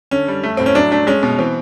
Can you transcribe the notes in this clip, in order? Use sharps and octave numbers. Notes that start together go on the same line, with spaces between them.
D3 C#4
G3
A3
A2 C4
C#4
F#3 D4
A3 D4
G#3 C#4
B2
E3 C4